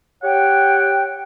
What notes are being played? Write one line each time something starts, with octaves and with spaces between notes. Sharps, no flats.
G4 C#5 F#5 G5